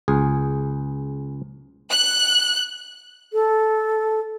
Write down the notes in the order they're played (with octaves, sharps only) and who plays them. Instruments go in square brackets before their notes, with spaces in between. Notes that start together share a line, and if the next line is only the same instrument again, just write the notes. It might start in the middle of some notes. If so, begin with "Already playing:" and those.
[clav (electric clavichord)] C#2 G#4
[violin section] F#6
[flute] A4